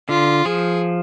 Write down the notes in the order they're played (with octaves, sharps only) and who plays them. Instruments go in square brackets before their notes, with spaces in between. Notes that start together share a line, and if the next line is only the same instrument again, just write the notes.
[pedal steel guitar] D3 [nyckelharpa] F4
[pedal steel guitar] F3 [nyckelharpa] G#4